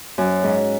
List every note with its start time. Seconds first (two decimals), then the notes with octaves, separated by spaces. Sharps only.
0.18 F#2
0.43 G#2